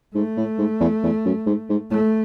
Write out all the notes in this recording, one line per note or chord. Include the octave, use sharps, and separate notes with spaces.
G#2 A3
A2
G#2
E2
E2
F#2
G#2
G#2
A2 A3